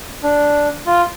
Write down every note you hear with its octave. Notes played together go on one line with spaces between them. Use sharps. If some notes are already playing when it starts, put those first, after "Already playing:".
D4
F4